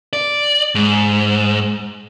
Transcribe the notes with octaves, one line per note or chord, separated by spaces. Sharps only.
D5
G#2